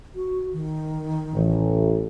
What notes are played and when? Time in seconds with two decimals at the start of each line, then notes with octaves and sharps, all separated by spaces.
0.15 F#4
0.53 D#3
1.33 A1